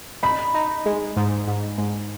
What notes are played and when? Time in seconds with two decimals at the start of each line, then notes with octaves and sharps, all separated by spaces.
0.23 D#4 B5
0.54 D#4
0.86 G#3
1.17 G#2
1.48 G#2
1.78 G#2